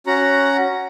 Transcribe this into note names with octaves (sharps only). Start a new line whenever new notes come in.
C#4 F#4 F#5 A#5